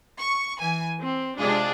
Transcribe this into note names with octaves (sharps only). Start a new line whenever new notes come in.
C#6
E3 G#5
C4
C3 G#3 D4 F4 G#4